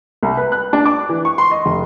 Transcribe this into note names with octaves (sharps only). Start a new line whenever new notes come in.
C2
B4
F#6
D4
D6
E3
C#6
C6
D#5
F1